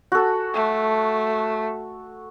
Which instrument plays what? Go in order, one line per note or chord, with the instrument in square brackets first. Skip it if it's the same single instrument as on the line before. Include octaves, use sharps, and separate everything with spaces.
[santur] F#4 A4
[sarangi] A3